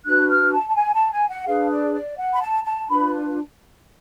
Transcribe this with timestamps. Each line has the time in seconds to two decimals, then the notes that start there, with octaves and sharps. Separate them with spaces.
0.05 D4 F#4 B4 F#6
0.29 F6
0.52 A5
0.68 A5
0.75 G#5
0.94 A5
1.12 G#5
1.29 F#5
1.46 D4 G#4 B4 F5
1.71 D5
1.94 D5
2.18 F#5
2.34 B5
2.41 A5
2.64 A5
2.89 D4 F4 B4 B5